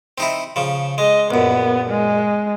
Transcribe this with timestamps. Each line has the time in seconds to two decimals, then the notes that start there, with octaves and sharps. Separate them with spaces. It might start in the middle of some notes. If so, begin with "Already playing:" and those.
0.18 C4 D#4 E4
0.56 C#3 F3
0.98 G#3 D#5
1.31 A#1 F#2 B3
1.90 G#3